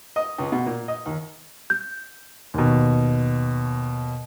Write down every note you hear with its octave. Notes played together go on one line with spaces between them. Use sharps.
D#5
C#2
B2
A#2
D#5
D#2
G6
D#2 B2